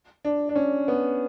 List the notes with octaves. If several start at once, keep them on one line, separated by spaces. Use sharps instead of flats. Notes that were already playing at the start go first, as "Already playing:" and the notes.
D4
D4
C#4
B3